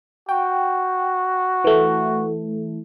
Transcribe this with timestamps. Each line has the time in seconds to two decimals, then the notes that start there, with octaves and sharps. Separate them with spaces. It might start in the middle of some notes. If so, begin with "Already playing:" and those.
0.29 F#4 G5
1.64 E3 A3